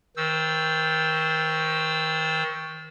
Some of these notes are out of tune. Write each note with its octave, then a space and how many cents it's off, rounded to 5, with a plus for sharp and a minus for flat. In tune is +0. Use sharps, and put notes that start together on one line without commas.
D#3 +30 C5 +0 E6 +0